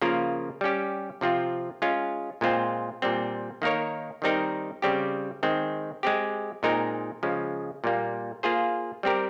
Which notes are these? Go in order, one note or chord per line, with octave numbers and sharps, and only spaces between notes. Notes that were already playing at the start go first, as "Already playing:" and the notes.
C#3 F3 A#3 F4 A#4
G3 C#4 G4
C3 F3 C4 F4
G#3 C#4 F4
A#2 G#3 C4 F4 C5
A#2 G3 C4
D#3 A#3 D#4 A#4 C#5
D#3 G3 C4 D#4 A#4
C#3 G3 C4 G4
D#3 G#3 C4
G#3 C4 G4
A#2 G#3 C4 D#4 A#4
C#3 F3 G#3
A#2 G3 A#3
A#3 F4 G#4 C5
G3 C4 G4 A#4